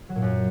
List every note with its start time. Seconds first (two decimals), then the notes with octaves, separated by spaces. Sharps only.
0.09 F#3
0.16 A#2
0.22 F#2